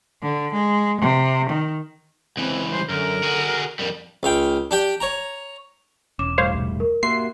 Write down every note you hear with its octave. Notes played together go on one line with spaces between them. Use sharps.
D3
G#3
C3
D#3
C#2 E3 C4
G3 C5
F#2 D3 A#4
F#4 G#4
F2 G3 A#4
C#2 F5 G5
D4 G4 G5
C#5 A#5
E1 C#4 D6 E7
A2 G3 A3 C5 C#5 F5
C2
A#4
A#3 F#4 G4 E5 C6 C7